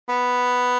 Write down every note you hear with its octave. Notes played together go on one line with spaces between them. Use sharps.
B3